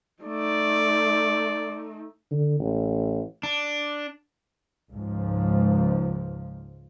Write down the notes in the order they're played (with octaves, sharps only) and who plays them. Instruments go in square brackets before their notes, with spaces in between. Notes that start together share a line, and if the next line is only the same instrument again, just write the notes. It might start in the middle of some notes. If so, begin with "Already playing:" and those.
[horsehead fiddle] A3 D#4 [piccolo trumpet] D5
[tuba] D3
A1
[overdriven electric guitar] D4
[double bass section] C#2 G#2 F3